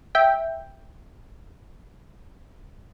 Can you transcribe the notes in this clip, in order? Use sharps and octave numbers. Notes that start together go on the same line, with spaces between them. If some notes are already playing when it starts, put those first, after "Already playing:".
E5 G5